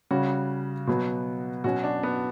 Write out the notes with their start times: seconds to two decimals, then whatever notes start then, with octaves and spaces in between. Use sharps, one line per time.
0.11 C#3 G3 C#4 F#4
0.87 B2 F#3 B3
1.64 B2 F#3 C#4 F#4
1.84 D4
2.03 B3